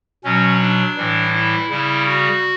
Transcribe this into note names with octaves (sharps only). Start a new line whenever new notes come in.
B2 F#3 C#4
D4
A2 E3 G3
E4
C#3 G3 E4
F#4